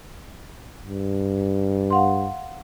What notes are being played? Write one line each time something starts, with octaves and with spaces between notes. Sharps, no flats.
G2
F5 F#5 C6